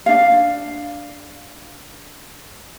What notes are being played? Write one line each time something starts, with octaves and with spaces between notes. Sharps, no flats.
D4 F5